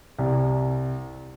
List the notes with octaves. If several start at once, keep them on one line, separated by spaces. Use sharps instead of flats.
C2